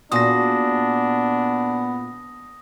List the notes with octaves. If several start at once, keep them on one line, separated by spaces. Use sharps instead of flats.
A#2 B3 D4 F#4 G#4 D#6 A#6